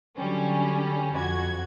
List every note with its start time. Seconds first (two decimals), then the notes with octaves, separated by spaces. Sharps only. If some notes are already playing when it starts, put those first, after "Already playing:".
0.16 D3 F#3 G3 C#4
1.15 F2 F#4 G#6